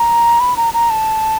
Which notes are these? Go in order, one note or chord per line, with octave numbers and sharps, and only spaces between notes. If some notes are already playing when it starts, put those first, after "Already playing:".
Already playing: A#5
B5
A#5
A#5
A5